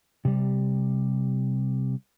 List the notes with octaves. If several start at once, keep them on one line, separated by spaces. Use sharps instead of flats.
C3 G3